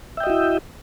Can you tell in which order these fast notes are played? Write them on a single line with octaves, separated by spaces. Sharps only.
E5 G5 D#5 F#4 E4